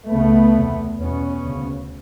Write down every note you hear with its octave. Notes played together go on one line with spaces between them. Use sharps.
C#2 C#3 A3 B3
E2 C3
E2 B2 B3 C#4
D2 C#3